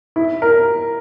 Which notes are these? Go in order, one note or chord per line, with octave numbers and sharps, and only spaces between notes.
E4
A#4